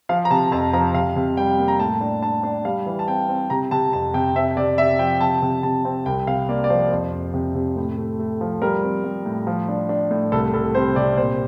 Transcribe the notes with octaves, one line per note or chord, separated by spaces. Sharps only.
F3 F5
A#5
C3 A5
F2 A5
F3 A#5
C3 F5
C3
G3 G5
A#3
A#5
A2 A5
D4
D4 A5
D4
G3 F5
E3
A5
C4 G5
C4
C3 A#5
C3 A5
F2 A5
C3 G5
C4 E5
C3 D5
C3 E5
F3 G5
C3 A5
C3
C3 A5
C4
C2 G5
C3 F5
A#3 D5
D5
F3 C5
F2
F2
C3
C3
A2
A3
A3
F3
G3 A#4
C4
G3
A2
F3
D4
D4
A2
C2 A4
C2 A4
C3 C5
C3 D5
A#2 C5